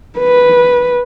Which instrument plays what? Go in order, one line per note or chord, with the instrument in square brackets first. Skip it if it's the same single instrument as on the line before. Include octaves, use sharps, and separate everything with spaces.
[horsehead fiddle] B4